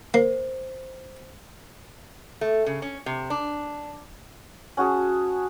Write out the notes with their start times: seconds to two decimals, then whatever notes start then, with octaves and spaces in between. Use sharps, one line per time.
0.14 A#3 C5
2.41 A3
2.66 C#3
2.82 C#4
3.06 C3
3.30 D4
4.77 C#4 F#4 G#4 A5